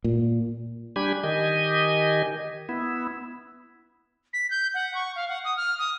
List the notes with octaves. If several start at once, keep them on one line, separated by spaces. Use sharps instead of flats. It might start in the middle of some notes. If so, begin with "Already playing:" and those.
A#2
G3 D4 G4 G#5 B5 G#6
D#3 G4 D#5 G#5
B3 E4
B6
G6
F#5
C#6
F5
F#5
D#6
F6
D#6